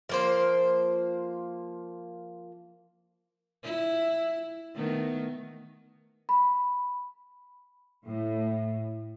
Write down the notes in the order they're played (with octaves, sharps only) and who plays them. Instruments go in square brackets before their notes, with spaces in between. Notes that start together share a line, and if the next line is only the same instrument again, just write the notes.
[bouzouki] F3 A#3 C5
[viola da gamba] E4
D#3 A3 B3
[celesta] B5
[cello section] A2